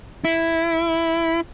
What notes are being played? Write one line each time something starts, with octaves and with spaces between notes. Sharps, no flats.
E4